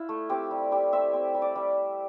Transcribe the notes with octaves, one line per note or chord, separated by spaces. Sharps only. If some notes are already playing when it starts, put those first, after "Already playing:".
Already playing: E4 F4
A3
C4 G4
G3
E4 G4
C4 E5
C4
G3
D5
G3